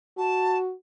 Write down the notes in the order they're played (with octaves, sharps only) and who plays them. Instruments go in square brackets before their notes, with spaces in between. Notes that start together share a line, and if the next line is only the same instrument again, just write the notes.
[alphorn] F#4 [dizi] A5